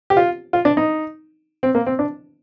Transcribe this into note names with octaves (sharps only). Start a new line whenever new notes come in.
G4
F4
F4
D4
D#4
C4
A#3
C4
D4